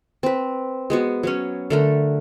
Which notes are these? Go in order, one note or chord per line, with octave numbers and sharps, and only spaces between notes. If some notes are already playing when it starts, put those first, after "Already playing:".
C4 B4
G#3 B3 F#4
F#3 B3 C#4
D3 A3 A#4